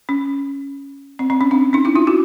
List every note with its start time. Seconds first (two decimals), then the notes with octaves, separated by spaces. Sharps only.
0.09 C#4
1.19 C4
1.30 C4
1.41 C#4
1.51 C4 D4
1.73 C#4 D#4
1.85 D4 E4
1.95 D#4 F4
2.07 E4 F#4